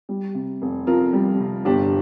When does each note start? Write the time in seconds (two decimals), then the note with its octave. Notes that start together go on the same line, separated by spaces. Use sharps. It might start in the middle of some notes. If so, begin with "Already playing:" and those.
0.09 G3
0.35 C3
0.62 F1
0.87 F2 F4 A#4
1.13 G3
1.40 C3
1.65 G1 D4 G4